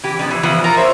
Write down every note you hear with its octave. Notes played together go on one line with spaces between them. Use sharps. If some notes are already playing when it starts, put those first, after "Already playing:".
E3 G4
D3 F3 B3
E3
E3 F3 B3
F4 A#4 A#5
C5 C#5 E5